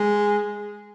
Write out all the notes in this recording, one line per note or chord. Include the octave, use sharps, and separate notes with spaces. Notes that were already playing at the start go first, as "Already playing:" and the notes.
Already playing: G#3